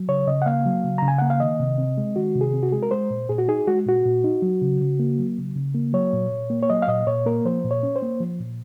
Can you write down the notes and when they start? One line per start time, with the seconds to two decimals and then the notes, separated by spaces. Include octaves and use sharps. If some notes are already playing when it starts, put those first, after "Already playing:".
Already playing: F#3
0.08 C#3 C#5
0.27 C#3 D#5
0.42 F#5
0.46 A#3 F5
0.65 F#3
0.84 C#3
0.98 C#3 A#5
1.08 G#5
1.18 A#3 F#5
1.30 F5
1.40 D#3 D#5
1.60 C3
1.78 C4
1.97 G#3
2.16 D#3 F#4
2.35 C3
2.41 G#4
2.53 C4
2.63 F#4
2.72 G#3 G#4
2.83 A#4
2.91 G#3 C5
3.10 A#2
3.29 A#2 G#4
3.39 F#4
3.48 D#4 G#4
3.67 G#3 F#4
3.86 A#2 F#4
4.06 A#2
4.24 D#4
4.42 F#3
4.62 C#3
4.81 C#3
4.99 A#3
5.18 F#3
5.38 C#3
5.56 C#3
5.75 A#3
5.93 F#3 C#5
6.13 A#2
6.32 A#2
6.50 A#3
6.63 C#5
6.70 F#3 D#5
6.82 F5
6.88 A#2 D#5
7.07 A#2 C#5
7.26 A#3 A#4
7.45 F3 C5
7.64 A#2
7.71 C#5
7.83 C#4
7.96 C5
8.02 A#3
8.20 F3
8.40 A#2